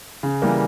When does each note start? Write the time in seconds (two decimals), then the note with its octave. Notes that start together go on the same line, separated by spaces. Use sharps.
0.23 C#3
0.42 E3 G3 A#3